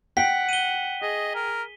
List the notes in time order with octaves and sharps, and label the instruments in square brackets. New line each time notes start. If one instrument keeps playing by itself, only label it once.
[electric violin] F#5 [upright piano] G5 [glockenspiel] B6
[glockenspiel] D#7 G7
[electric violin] G#4 [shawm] D#5
[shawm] A#4